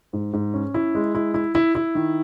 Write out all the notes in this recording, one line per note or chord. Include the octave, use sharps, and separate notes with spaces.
G#2
G#2
C#4
E4
G#3
E4
E4
E4
E4
D#3